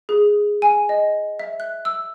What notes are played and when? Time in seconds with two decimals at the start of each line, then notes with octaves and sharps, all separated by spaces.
0.09 G#4
0.62 G#5
0.89 D#5
1.39 E5
1.60 F#6
1.85 E6